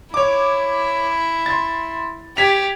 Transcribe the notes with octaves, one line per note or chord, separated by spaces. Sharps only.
E4 C#5 D6
C6 A6
G4 G#6 B6 F7